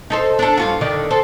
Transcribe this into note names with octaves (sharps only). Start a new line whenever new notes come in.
D#4 A4 C5
D4 A4
G2 F4 F#4
D3 D#3 D5
A4 C5